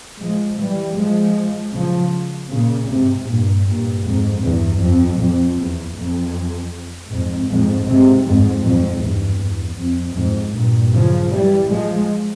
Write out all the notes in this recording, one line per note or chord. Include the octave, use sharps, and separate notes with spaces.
F3 G#3
E3 G3
F3 G#3
C#3 F3
A#2 C#3
G#2 C3
G2 A#2
G2 A#2
F2 G#2
E2 G2
F2
F2
E2
F2
F2 G#2
F2 G#2
G#2 C3
F2 G#2
F2 G#2
E2 G2
E2
F2
F2 G#2
G2 A#2
C#3 F3
E3 G3
F3 G#3